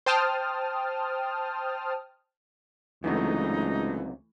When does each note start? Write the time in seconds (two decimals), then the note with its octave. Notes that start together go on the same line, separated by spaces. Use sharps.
0.06 C5 G5 A5 D#6 F6
3.04 C#2 F#2 C3 E3 F#3 A3 D#4